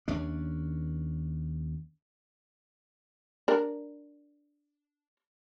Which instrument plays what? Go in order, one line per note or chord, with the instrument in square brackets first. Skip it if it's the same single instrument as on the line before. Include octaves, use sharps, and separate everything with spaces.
[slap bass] D#2 C#4 D4
[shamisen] D4 A#4